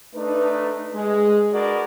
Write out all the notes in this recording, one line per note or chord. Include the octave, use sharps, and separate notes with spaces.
A3 D4 D#4 B4
G#3
D4 F#4 G#4 A#4 B4 D5